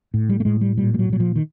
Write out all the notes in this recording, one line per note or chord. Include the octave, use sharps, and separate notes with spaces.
A2
G3
A3
A2 G#3
G3
A#2 G3
G3
F#3
A#2 F#3
F3
D#3